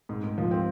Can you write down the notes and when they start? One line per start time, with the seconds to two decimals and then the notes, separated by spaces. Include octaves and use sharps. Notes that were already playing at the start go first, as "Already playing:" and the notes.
0.09 G#2
0.24 G#2
0.38 F3
0.51 C4